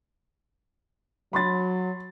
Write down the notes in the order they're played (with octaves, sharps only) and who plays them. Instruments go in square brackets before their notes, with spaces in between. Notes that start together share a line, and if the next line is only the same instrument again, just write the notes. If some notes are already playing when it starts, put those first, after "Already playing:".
[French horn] F#3 [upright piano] B5 C6 A6